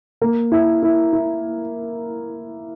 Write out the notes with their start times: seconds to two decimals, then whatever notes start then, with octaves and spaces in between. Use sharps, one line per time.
0.21 A#3
0.52 E4
0.83 E4
1.13 E4